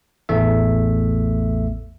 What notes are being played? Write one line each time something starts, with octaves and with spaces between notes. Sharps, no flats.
A1 E2 A3 E5